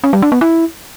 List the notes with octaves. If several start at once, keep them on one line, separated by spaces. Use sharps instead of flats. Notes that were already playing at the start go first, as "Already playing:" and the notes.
C#4
G3
D4
B3
E4